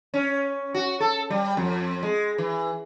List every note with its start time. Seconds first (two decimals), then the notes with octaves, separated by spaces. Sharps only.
0.14 C#4
0.75 F#4
1.00 A4
1.30 G3
1.57 F2
2.03 G#3
2.38 E3